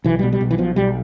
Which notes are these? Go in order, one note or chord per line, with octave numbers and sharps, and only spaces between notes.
B1 E3
B2 G3
G3
B1
E3
B2 F3
B1 G3